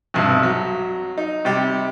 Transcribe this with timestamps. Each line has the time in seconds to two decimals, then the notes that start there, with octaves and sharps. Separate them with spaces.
0.14 B1 G2 C3
0.43 F#3
1.18 D#4
1.45 C3 G3 G4